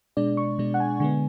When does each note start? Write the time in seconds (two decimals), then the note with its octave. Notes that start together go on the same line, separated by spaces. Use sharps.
0.17 B2 G#3 D4 D5
0.37 C#6
0.59 B2 G#3 D4
0.74 F#5
0.80 G#5
1.00 D3 G#3 B3 G#5